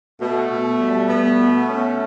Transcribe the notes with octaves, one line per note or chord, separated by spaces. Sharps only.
B2 A3
B2
G3
B3
B2
C#4